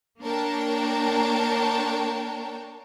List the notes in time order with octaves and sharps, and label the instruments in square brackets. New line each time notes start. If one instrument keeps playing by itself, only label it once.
[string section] A#3 D4 A#4 C#5 G5 A5